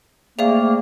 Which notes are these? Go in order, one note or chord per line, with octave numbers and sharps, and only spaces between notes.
C3 A3 A#3 G#4 D5 F5